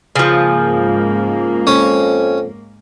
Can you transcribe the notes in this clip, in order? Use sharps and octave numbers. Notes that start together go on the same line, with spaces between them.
G#2 C#3 F3 A#3
F2 C#4